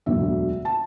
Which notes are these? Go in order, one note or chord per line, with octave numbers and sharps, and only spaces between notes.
E1 D2 D3 F#3 E5
A5